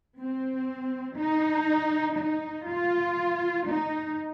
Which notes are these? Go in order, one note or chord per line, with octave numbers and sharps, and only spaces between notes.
C4
D#4
D#4
F4
D#4